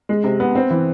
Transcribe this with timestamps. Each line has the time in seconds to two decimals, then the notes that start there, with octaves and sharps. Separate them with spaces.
0.09 G#3
0.24 C3
0.40 B3
0.55 C4
0.70 E3